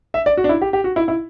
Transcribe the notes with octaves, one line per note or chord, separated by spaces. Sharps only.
E5
D5
F#4
D4
E4
G4
G4
F#4
E4
E4